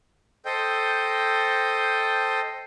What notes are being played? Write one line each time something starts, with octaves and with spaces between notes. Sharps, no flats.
A4 C5 D#5 G5